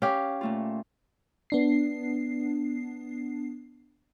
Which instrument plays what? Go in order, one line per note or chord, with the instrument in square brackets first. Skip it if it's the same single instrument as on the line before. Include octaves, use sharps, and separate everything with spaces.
[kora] C#4 G4 [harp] F5
[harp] A#2 A3 F4
[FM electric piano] B3 D4 C7